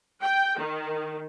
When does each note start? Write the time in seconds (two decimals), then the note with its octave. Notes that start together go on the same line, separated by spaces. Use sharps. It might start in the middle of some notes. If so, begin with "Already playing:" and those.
0.21 G5
0.58 D#3